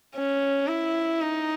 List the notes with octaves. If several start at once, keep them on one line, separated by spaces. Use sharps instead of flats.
C#4
E4
D#4